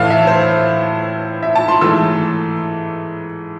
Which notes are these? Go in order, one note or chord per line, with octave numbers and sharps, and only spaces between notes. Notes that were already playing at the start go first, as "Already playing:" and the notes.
Already playing: A2 E3 A3 F5 A5
E5
C5
E5
A5
C6
G#2 E3 A3 E6